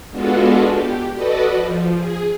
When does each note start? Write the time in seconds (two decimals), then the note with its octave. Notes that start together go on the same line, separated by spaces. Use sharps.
0.11 G#3 B3 D4 F4 F#4 A4
0.68 G4
1.13 F#4 A4 B4 D5 D#5
1.54 F3
1.96 G#4